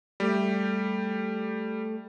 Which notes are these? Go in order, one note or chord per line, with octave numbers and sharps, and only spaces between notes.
G3 A3 G4